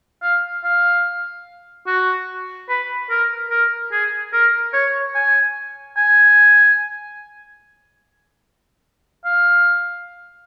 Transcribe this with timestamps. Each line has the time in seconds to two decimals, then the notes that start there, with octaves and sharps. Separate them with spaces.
0.23 F5
0.64 F5
1.87 F#4
2.69 B4
3.10 A#4
3.51 A#4
3.92 G#4
4.33 A#4
4.73 C#5
5.15 G#5
5.97 G#5
9.25 F5